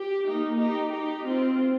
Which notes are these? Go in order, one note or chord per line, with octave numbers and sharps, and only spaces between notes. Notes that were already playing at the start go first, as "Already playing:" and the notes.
Already playing: G4
A#3 D#4
D#4 G4
D#4 G4
C4 F4